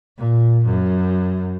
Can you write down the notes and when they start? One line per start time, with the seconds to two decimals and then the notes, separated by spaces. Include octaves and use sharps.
0.18 A#2
0.64 F#2